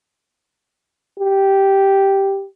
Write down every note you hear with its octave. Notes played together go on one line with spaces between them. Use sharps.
G4